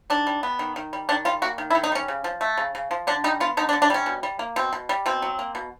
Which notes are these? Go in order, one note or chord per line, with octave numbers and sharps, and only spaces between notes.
D#3 D4
G3
B3
D#3
D#3
G3
D#3 D4
G3 F4
A#3 F#4
D#3
E4
D#3
D#4
G3 C#4
C#3
F3
A3
C#3
C#3
F3
D3 D4
G3 D#4
B3 F4
D3 D#4
D4
D3
D4
G3 C#4
B2
G3
A#3
B2 C4
B2
G3
B2 C4
F#3
A#3
B2